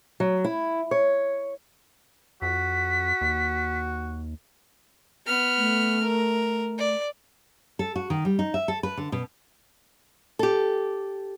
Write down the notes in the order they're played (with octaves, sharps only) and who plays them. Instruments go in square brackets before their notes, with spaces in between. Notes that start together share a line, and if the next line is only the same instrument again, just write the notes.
[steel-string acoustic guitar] F#3
E4
C#5
[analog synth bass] F2 [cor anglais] F#4 [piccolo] B6
[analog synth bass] D#2
[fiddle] B3 F6
[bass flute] A3
[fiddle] A#4
D5
[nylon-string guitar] A4
F#4
D#3
G3
D#4
E5
A4
B4
D3
B2
G4 A4